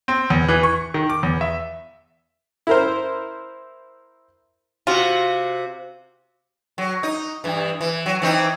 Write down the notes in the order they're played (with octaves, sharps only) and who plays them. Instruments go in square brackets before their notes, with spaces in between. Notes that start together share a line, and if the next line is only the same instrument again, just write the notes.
[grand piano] C4
E2
E3
C#6
D#3
D6
E2
E5
[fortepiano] E4 A#4 C5
[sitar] C3 F#4 [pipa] F4
[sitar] F#3
D#4
G2 E3
E3
F#3
E3 C4 D#4